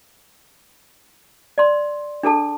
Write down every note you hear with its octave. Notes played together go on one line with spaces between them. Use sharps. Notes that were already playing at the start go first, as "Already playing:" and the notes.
D5 C6
D4 G#4 A4 A5